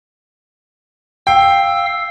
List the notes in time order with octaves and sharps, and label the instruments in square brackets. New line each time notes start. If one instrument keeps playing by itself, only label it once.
[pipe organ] F5 E6 [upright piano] G5